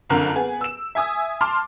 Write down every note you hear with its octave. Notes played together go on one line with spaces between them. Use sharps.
F#1 F2 D3 A#4
B3 G#4
E6 E7
E5 G#5 D#6 E6
A5 C6 D6 F6